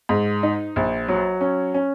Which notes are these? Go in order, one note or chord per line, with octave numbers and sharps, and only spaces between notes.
G#2
D#4
A#1
F#3
C#4
C#4